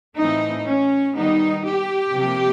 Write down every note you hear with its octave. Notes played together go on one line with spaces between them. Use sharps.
A2 E3 A3 C4 D#4
C#4
D#3 G3 B3 D#4
G4
C3 F3 A#3